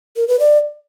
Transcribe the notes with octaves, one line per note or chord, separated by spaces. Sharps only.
A#4
B4
D5